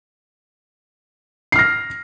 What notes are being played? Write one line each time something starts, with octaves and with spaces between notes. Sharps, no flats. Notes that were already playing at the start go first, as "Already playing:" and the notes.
F6 A#6 C7